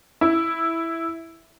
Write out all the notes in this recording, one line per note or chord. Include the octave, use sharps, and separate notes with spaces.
E4